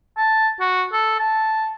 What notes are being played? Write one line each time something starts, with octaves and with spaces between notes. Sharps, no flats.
A5
F#4
A4
A5